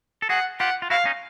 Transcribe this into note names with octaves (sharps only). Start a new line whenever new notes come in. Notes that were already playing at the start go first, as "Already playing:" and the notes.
A4
F#4 G#4 F#5
F4 G4 F#5
F4
E4 F#4 F5
C#4 D#4